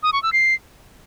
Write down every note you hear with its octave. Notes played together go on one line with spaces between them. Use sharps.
D#6
C#6
E6
C7